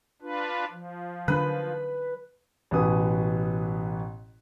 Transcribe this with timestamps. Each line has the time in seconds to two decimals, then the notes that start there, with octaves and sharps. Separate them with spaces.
0.22 D4 F4 B4
0.71 F3
1.28 D3 F#3 D4 B4
2.71 A1 B2 B4 G#5 D#6